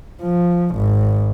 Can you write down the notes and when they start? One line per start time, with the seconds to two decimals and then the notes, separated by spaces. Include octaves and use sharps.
0.22 F3
0.76 G#1